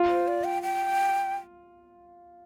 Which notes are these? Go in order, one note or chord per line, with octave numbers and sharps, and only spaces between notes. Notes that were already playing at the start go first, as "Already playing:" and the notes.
Already playing: F4
C5
D5
G5
G5